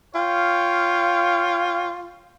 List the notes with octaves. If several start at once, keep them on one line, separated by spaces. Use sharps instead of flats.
F4 C#5 F5 G5